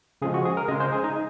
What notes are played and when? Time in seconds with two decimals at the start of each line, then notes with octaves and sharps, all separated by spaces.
0.22 C#3 F3 G#3 G#4
0.34 F#4
0.45 G#4
0.57 A#4
0.68 C#3 G#3 D#5
0.80 C5
0.93 G#4
1.04 D#4